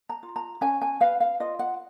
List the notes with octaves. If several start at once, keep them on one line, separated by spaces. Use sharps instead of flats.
A#5
F4
A#5
C#4 G#5
G#5
B4 F5
F5
F4 D#5
F#5